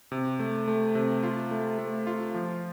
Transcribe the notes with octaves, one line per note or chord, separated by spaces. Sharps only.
C3
A3
A3
C3
F4
A3
A3
F4
F3